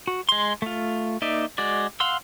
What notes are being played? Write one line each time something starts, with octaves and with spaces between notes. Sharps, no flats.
F#4
G#3 C6
A3 F4
A#3 D#4 D5 E5
G#3 F#4 D5
F5 F#5 C6 E6